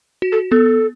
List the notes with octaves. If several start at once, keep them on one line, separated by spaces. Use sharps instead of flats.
F#4
A4
B3 A4